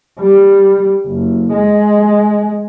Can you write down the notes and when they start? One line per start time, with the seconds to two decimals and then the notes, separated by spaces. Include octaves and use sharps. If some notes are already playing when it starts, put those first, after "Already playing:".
0.19 G3
1.07 F#1
1.53 G#3